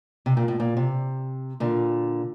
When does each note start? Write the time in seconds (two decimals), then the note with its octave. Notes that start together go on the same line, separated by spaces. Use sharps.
0.26 C3
0.37 A#2
0.48 A2
0.60 A#2
0.77 C3
1.60 A#2 D3